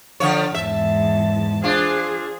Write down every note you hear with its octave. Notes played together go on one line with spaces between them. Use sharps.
D3 F3 C#5
E2 G#2 E5 A5
D4 F4 G#4 C5